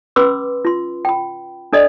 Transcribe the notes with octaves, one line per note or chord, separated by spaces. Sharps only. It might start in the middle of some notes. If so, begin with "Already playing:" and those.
C#4 B4 B5 C6 D6 E6
F4 C6
G5 B5
D4 A4 D5 D#5